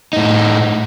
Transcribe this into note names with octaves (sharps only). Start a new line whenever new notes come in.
A2 D#4